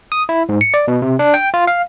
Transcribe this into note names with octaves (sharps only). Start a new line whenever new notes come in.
D#6
E4
G#2
C#7
D5
B2
C3
D4
G5
F4
F5